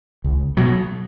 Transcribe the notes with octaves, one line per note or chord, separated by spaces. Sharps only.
C#2
B2 F#3